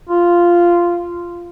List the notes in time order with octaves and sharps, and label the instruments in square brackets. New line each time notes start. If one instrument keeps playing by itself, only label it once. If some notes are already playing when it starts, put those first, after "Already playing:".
[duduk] F4